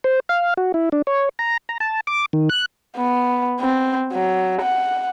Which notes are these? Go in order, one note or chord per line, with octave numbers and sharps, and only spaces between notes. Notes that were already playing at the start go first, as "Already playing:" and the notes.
C5
F5
F#4
E4
D4
C#5
A#5
A#5
A5
D6
D#3
F#6
B3
C4
F#3
F#5